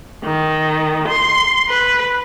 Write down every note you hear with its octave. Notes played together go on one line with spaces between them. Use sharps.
D#3
C6
B4